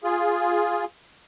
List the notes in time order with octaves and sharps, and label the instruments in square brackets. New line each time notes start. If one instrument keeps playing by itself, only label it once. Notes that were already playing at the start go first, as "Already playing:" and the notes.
[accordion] F4 G#4